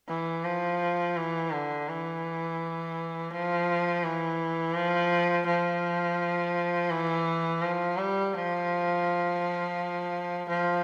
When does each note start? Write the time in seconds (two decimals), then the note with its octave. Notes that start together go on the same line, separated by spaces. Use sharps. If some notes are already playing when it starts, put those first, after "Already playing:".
0.08 E3
0.45 F3
1.16 E3
1.51 D3
1.88 E3
3.31 F3
4.03 E3
4.74 F3
5.46 F3
6.90 E3
7.62 F3
7.97 G3
8.34 F3
10.49 F3